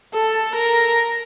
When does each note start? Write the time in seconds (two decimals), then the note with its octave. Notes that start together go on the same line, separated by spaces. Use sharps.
0.14 A4
0.55 A#4